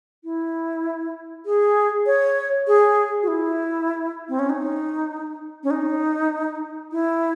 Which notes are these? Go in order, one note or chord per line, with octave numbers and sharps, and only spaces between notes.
E4
G#4
C#5
G#4
F#4
E4
C4
C#4
D#4
C#4
D#4
E4